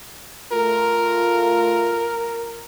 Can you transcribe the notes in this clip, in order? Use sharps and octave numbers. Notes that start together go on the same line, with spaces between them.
A3 F4 A#4